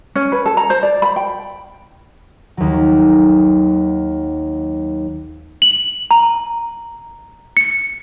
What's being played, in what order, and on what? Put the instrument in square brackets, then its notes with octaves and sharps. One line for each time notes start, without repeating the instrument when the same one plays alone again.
[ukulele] C#4
B4
A4
A#5
C5
D5
B5
G5
[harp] D#2 F#3
[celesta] F#7
A#5
C#7